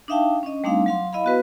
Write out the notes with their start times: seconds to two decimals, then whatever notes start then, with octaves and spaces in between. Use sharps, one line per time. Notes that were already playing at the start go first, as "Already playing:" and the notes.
0.08 D4 D#4 E5 F5 G5 A5
0.43 C#4 D4 D#5
0.64 G3 A3 C4 D4 D#4 F5
0.86 F#3 F5 C6
1.13 E4 D#5 F5 B5
1.24 B3 F#4 B4